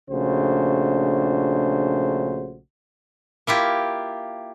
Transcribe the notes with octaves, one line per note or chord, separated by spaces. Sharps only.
A#1 C#3 A3 D4 F#4 C5
A#3 E4 F4 G4